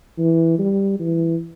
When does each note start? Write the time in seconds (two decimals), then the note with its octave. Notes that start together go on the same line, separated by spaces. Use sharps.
0.18 E3
0.59 G3
0.99 E3